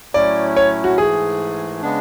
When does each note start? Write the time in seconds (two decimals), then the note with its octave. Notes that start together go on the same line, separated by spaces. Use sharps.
0.14 A2 F#3 A3 C#4 E4 D5
0.57 C#5
0.84 F#4
0.98 G#2 E3 A3 G#4
1.82 C#3 G#3 B3 D4